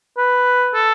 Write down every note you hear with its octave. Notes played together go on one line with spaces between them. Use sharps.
B4
A4